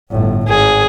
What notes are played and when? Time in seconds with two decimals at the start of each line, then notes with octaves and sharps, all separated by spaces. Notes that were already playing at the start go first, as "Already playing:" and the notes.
0.11 G1 A2
0.49 G#1 G#4